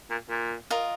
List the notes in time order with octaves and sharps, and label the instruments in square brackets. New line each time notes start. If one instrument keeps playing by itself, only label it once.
[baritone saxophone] A#2
A#2
[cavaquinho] F4 A#4 D#5